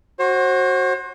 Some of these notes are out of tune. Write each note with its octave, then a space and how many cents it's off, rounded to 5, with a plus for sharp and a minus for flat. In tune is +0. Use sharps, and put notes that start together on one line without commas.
F#4 +0 C5 +35